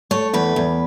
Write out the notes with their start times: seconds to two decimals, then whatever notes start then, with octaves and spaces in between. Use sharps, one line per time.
0.11 A3 C#5
0.34 E2 B4
0.56 E2